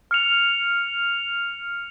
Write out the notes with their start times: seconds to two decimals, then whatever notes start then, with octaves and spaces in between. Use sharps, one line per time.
0.11 F6 C#7 F7